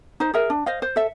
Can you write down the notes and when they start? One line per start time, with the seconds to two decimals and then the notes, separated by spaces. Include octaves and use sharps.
0.20 D#4 C5
0.34 G#4 A#4 E5
0.50 D4
0.66 C5 D#5 F5
0.82 C5
0.96 A4 E5